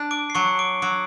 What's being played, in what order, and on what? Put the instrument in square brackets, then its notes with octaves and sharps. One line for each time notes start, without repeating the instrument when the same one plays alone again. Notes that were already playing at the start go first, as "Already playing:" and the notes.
Already playing: [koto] D4
[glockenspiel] D6 D7
C7
[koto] F#3 [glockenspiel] C#6 C#7
[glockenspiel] D6 D7
[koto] F#3 [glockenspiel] D6 D7